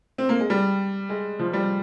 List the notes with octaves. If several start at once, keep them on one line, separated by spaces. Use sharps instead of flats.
C4
A#3
G#3
G3
G#3
F3
G3